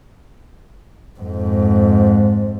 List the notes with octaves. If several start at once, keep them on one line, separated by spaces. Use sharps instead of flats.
F2 G#2